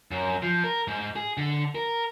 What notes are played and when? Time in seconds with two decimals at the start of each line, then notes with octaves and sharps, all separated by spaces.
0.11 F#2
0.43 F3
0.64 A#4
0.88 G#2
1.16 G#4
1.37 D3
1.75 A#4